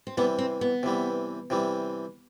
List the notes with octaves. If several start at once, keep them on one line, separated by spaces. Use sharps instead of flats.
C4
C3 E3 G3 B3
C4
B3
C3 E3 G3
C3 E3 G3